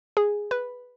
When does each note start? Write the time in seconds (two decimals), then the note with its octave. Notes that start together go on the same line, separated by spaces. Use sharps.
0.17 G#4
0.51 B4